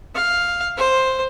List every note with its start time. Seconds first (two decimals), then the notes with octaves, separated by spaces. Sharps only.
0.15 F5
0.77 C5